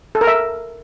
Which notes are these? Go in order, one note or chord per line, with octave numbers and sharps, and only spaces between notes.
A4
A#4
E5